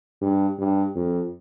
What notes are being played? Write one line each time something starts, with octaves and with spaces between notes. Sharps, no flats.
G2
G2
F2